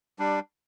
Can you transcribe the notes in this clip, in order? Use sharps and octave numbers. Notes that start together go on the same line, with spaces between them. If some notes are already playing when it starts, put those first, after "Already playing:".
G3 D4